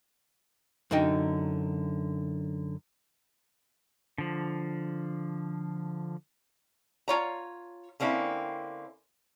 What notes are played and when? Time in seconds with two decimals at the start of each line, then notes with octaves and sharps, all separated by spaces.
0.91 F#2 D3 D#4 D#5 G5
4.18 D3 F3
7.08 F4 C#5 A#5
8.00 D3 A#3 C4 C#4 E4